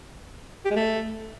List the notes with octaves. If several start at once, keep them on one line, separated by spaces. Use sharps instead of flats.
G4
G#3
A3